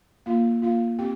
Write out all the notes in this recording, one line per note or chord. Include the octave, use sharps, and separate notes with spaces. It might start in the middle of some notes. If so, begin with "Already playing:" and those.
A#3 F4 F5
A#3 F4 F5
C4 G4 G5